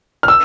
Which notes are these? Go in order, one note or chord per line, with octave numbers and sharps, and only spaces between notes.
F6
E6